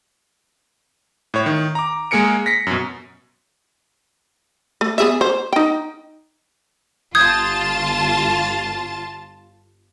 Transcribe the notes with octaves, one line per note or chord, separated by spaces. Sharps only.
A2 C#5
D#3
A#5 D6
G#3 A#3 G#4 A#4 C#7 D7
A#6 B6 C#7
F#2 B2
A3
B3 G#4 E5
C5
D#4 G5
G1 F4 A5 D#6 G6 G#6